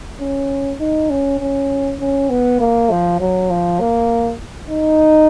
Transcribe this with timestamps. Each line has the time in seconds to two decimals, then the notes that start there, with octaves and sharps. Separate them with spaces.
0.21 C#4
0.80 D#4
1.10 C#4
1.40 C#4
2.00 C#4
2.30 B3
2.60 A#3
2.91 F3
3.20 F#3
3.50 F3
3.80 A#3
4.70 D#4